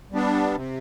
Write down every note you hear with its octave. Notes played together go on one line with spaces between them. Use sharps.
G3 B3 D4
C3